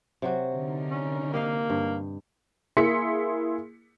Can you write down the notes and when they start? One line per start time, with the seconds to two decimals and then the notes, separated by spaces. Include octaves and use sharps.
0.22 C3 F#3 F#4
0.55 D3 D#4 A#4
0.91 C#4
1.33 A#3 G4 D#5 F5
1.70 G2
2.77 A#3 E4 G#4 C6 B6 C#7